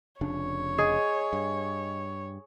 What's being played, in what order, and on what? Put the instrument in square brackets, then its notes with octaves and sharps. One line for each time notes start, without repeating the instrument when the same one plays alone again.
[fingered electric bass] F1 C#3 D4 [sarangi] C#5
[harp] G#4 [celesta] D#5
[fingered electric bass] G2